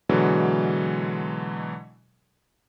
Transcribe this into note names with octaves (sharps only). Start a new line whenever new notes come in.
B2 D3 E3 F#3 G#3